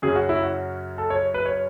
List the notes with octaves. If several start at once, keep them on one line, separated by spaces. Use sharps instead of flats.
F#2 C#3 F#3 C#4 G#4
F#4
E4
F#4
A4
C#5
B4
C#5